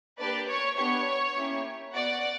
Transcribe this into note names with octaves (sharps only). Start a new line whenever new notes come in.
A#3 D4 G4 B4 D5
C#5
B3 D4 G4 C#5
A#3 C#4 E4 G4
B3 F#4 D5 F#5